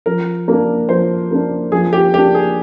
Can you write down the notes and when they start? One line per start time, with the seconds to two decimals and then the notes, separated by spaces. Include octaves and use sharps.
0.06 F3 A#4
0.48 A#3 D4
0.89 F3 C5
1.31 A#3 D4
1.72 F3 G#4
1.93 G4
2.14 A#3 D4 G4
2.35 G#4